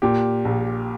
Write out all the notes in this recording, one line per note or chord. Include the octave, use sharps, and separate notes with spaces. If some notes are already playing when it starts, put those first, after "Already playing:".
A#2 G4
A#1